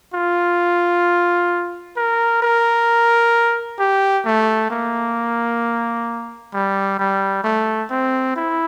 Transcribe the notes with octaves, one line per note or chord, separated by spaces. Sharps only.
F4
A#4
A#4
G4
A3
A#3
G3
G3
A3
C4
E4